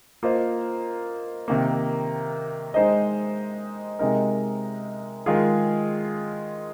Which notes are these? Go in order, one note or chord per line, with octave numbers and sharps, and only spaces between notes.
A#3 F4 C5 D#5
C3 D#3 A#3
G#3 D#4 C5 D#5
C3 G#3 D#4 A#4
D#3 G#3 F4 G#4